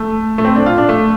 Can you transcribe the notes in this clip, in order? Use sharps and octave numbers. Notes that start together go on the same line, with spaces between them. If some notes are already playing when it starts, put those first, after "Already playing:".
Already playing: A3
A3
C4
D4
F4
D4
A3